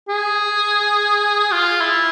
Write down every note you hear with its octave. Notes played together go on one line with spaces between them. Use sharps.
G#4
F4
E4